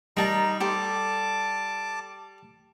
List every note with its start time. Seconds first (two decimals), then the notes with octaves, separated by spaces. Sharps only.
0.17 G3 D#4 A#4 A5 A#5
0.60 G4 A4 C5 A5 D6